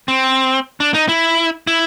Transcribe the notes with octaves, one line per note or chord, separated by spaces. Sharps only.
C4
D4
D#4
E4
E4